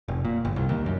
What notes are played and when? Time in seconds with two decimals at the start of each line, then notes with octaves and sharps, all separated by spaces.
0.08 F1
0.25 A#2
0.45 G1
0.56 C2
0.69 D#2
0.86 F#2